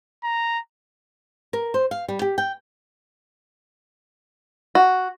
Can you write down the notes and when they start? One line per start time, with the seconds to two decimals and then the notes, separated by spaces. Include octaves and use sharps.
0.24 A#5
1.53 A#4
1.74 C5
1.91 F5
2.08 G3
2.22 G4
2.38 G5
4.75 F#4